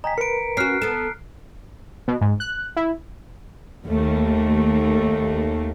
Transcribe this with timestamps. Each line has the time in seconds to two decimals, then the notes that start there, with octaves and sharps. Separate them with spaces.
0.04 D#5 G5 G#5 A#5 B6
0.18 A#4 B4 C#7 D7
0.57 C#4 F#4 F6 F#6 C7
0.82 B3 A4
2.08 B2
2.21 G#2
2.40 F#6
2.77 E4
3.83 D#2 A3